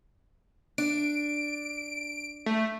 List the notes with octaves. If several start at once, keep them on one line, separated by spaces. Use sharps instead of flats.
D4 D7
A3